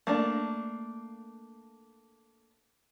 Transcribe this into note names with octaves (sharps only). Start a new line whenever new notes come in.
A3 A#3 D4